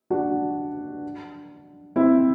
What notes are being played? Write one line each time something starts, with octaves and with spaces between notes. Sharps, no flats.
D4 F#4
C4 E4